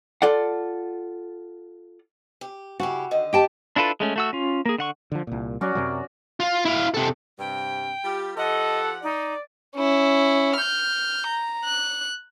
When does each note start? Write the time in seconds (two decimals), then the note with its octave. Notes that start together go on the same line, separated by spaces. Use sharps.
0.22 F4 A4 D5 F#5
2.41 G4
2.80 C#3 E4 F#4 G4
3.11 D3 D#3 D#5
3.33 G4 G5 A5
3.76 D4 E4 F4 A4 B4
4.00 G#3 A3 C#4
4.16 A3 F#4 E6
4.33 C#4 F4
4.66 A#3 G#4
4.78 D3 F#5 C#6
5.12 D3 F3
5.27 C2 A#2
5.61 F#3 C#4 F#4 D5
5.75 F#2 C3 F#3
6.40 F4
6.65 E4 F5
6.94 C3 A4
7.39 G2 C3 G5
8.05 G3 F4 G4
8.37 F3 G4 A4 D#5 F#5
9.03 D#4 D5
9.77 C#4 E4
10.57 F6 G6
11.27 A#5
11.65 F#6